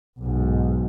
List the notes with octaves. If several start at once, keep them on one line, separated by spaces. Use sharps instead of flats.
B1 G#2